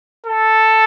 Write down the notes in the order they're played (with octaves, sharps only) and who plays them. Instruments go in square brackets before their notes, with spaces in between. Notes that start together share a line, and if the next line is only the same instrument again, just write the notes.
[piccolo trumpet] A4